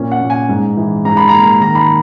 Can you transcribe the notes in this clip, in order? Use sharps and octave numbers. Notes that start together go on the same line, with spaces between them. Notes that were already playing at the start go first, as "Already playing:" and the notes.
Already playing: A#2 C#4
F#5
A#2
G#5
G#2
E3
G#2 A#5
B5
A#3 A#5
D#3 A#5
B5